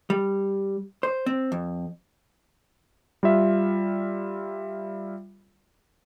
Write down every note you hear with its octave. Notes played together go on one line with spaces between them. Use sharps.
G3
C5
C4
F2
G3 F4 E5